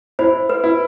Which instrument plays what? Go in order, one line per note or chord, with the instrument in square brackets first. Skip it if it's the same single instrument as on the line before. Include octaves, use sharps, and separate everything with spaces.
[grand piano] E4 [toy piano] C5
[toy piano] B4
[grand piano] E4